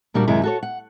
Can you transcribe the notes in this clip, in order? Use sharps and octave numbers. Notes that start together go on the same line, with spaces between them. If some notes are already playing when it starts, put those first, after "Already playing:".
D2 A#2 G3 D4 F#4 A#4
F#2 C3 D#3 G#3 E4
F#4 A4 C#5
F#5